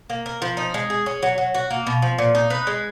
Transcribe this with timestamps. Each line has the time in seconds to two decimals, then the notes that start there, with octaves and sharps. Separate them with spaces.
0.10 A#3
0.26 A#4
0.42 F3
0.57 D#4
0.74 G#3
0.90 G#4
1.06 C#4
1.22 F#3
1.38 F#3
1.54 F#4
1.70 A#3
1.87 B2
2.02 F3
2.18 A#2
2.35 D#4
2.50 B4
2.67 G#3